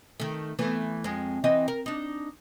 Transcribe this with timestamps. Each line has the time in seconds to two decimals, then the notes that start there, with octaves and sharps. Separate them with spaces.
0.20 D#3 A3
0.59 E3 A3 B3
1.04 F2 G#3
1.44 E3 C4 D#5
1.68 A#4
1.86 D4 D#4